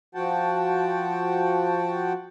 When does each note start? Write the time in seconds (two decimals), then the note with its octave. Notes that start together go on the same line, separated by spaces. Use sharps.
0.15 F3 F#4 F#5 G5 A5